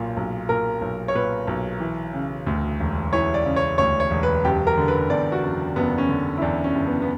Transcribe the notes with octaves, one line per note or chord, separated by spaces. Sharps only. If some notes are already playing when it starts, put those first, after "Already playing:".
Already playing: B1 A#2
B1
A#2 A#4
B1
C#5
A#2 B4
B1
E3
C#3
D2
E1
E3 C#5
D5
C#3
C#5
D2 C#5
C#5
E1
B4
F#1 G4
A#4
D3
B4
E2 D5
F#4
F#1
F#1 B3
C#4
D3
E4
E2 D4
C#4
F#1
B3
B3